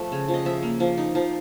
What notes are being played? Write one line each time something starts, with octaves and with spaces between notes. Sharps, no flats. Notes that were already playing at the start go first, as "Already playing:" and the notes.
Already playing: F3 A3
C#3
F3
D#5
F3 E5
A#3
F3
D#4
F3